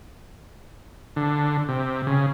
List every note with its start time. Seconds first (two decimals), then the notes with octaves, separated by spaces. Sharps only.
1.16 D3
1.69 C3
2.07 C#3